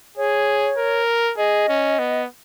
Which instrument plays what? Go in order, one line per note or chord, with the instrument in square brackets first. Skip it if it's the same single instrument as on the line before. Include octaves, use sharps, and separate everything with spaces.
[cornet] G#4 [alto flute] C#5
[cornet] A#4
[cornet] G#4 [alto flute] D#5
[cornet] C#4
B3